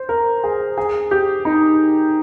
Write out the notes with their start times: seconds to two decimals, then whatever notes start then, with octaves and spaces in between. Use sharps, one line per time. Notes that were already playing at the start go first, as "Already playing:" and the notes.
Already playing: C5
0.09 A#4
0.44 G#4
0.77 G#4
1.11 G4
1.45 D#4